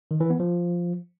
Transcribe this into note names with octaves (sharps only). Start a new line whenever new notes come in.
D#3
E3
B3
F3